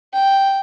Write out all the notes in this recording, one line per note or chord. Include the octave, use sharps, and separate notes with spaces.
G5